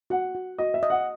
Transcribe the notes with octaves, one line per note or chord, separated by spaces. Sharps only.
F#4 F#5
F#4
F#4 D#5
E5
D#5
F#5